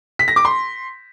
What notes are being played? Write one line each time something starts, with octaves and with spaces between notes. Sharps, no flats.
B6
A#6
D6
C6